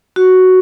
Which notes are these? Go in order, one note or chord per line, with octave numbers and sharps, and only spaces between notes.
F#4